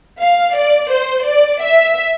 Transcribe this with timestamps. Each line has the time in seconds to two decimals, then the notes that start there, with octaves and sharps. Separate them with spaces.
0.20 F5
0.56 D5
0.91 C5
1.26 D5
1.62 E5